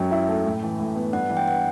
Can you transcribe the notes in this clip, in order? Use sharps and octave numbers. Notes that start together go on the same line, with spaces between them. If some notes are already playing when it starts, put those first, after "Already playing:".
Already playing: F#2 F#3 G5
E4
A3
A2
E3
A2
B3
G2 F#5
E3
G5
F#5